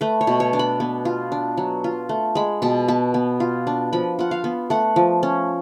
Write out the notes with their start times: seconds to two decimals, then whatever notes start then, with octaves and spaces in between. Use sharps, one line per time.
0.01 A3 B4
0.21 C#5
0.27 B2
0.40 C#5
0.53 D4
0.59 B5
0.80 B3
1.05 F4
1.32 D4
1.57 F#3
1.84 F4
2.09 A3
2.35 G#3 B5
2.62 B2 A5
2.88 B3 A5
3.14 B3
3.40 F4
3.67 D4
3.93 F3 B5
4.19 F4 F#5
4.31 F5
4.44 B3
4.70 A3 F#5
4.96 F3
5.23 C#4